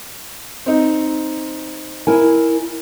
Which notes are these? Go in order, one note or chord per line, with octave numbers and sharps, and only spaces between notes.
C4 D#4
E4 A#4 G#5